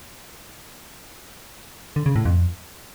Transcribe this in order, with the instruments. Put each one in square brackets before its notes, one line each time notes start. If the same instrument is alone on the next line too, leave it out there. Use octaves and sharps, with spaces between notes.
[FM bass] D3
C#3
A2
F2